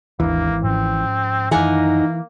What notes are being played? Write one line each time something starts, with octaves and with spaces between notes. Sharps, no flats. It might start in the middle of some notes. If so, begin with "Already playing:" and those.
G#1 D#2 E3 A#3 C4 D4
G#2 F3 C4 C#4
F#2 D#3 E3 A#3 D#4 F#5 G#5